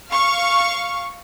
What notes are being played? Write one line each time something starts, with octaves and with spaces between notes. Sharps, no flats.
F5 C#6